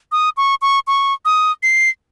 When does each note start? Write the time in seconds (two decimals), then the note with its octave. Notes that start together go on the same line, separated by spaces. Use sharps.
0.12 D#6
0.37 C#6
0.62 C#6
0.87 C#6
1.25 D#6
1.63 C7